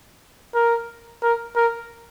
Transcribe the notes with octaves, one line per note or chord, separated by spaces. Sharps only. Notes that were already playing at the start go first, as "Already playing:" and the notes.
A#4
A#4
A#4